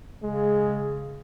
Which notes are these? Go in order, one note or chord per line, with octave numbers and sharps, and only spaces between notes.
C#3 G#3